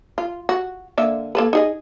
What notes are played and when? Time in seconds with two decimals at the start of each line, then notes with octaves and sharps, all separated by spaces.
0.18 F4
0.49 F#4
0.98 D3 A#3 E5
1.35 A#3 A4 B4
1.53 D#4 G#4 D#5